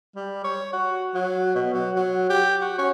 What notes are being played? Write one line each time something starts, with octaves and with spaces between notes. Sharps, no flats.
G3
C#5
F#4
F#3
B2
F#3
F#3
G4
F#4
C#4